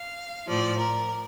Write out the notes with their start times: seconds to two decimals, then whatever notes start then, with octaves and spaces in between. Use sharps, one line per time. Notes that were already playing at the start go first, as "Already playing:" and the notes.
Already playing: F5
0.47 A2 F3 D5
0.78 A#4